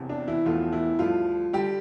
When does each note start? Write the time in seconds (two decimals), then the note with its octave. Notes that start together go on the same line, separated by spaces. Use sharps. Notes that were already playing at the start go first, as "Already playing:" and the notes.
Already playing: E1 E2 C3
0.09 D4
0.28 E3 E4
0.45 E1 E2 B2 F3 A3 F4
0.72 E3 E4
0.99 D2 D3 F3 G3 F4
1.53 D3 G3 G4